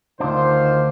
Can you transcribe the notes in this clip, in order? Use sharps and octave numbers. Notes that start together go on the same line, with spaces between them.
D2 D#3 D4 F4 C5